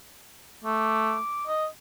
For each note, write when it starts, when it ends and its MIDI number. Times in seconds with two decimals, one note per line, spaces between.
0.64 1.18 57
0.64 1.46 86
1.47 1.67 75